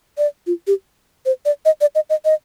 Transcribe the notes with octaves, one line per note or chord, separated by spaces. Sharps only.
D5
F4
G4
C5
D5
D#5
D5
D#5
D#5
D#5